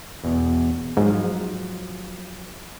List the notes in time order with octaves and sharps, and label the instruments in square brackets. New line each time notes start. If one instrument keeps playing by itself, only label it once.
[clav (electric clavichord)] E2 B2
[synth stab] G#2 [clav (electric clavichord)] F3 F#3